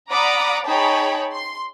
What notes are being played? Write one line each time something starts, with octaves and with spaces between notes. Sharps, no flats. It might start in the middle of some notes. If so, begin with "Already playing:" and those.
D5 F#5 A#5 B5 D6 D#6
D#4 G#4 C#5 G5 A5 B5
C6